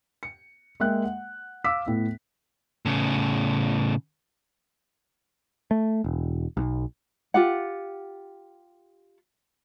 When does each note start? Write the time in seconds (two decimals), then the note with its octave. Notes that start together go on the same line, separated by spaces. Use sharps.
0.23 C#7
0.80 G#3 A#3 E5 G5 F#6
1.04 F#5
1.64 F5 D6 E6 B6
1.86 A2 B3
2.85 A2 C#3
5.71 A3
6.04 E1
6.57 B1
7.34 F4 G4 F#5